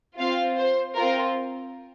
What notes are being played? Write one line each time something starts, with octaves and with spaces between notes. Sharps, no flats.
C4 F4 F5
C5
C4 F4 A#4